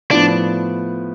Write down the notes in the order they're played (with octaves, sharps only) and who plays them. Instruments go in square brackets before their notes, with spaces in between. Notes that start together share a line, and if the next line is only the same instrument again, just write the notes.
[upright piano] A2 F3 B3 [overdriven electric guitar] D4